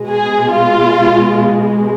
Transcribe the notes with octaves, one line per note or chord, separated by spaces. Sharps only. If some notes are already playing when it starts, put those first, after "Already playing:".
Already playing: B2 G#3
G#4
F4